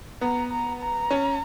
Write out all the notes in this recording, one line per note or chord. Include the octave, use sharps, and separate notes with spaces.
B3 A#5
A#5
A#5
C#4